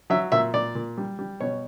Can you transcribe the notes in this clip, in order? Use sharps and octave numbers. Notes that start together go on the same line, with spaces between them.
F#3 E5
A#2 E5
A#2 D5
A#2
G3
G3
B2 C#5